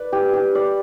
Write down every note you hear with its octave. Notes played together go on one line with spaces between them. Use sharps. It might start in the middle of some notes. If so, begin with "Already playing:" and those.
Already playing: B4 D5
G4
G4
D5